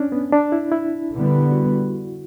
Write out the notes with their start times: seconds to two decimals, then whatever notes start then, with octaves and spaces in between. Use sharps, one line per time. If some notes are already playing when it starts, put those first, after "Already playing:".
Already playing: C#4 D4
0.12 B3
0.33 D4
0.52 E4
0.72 E4
1.13 D3 G3 B3
1.52 F#4